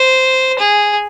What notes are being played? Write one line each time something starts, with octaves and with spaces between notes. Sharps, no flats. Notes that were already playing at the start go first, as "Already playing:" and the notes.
Already playing: C5
G#4